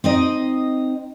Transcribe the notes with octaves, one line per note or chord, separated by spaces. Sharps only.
C4 D#4 D#5